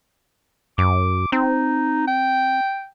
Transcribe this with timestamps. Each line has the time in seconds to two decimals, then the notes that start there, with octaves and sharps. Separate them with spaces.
0.78 F#2 D6
1.32 C4 D#4
2.08 G5